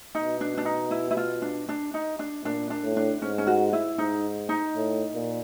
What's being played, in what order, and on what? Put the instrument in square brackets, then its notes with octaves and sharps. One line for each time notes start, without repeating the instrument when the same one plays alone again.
[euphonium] B2 [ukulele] D#4
[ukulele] D4
D4
D#4
E4
E4
F4
D4
D4
D#4
D4
[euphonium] A#2 [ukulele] D4
[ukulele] D4
[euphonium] A2
[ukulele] D4
[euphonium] G#2 [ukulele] C#4
[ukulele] C#4
F#4
E4
[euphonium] G#2 [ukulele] D#4
[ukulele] D#4
[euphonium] A2
A#2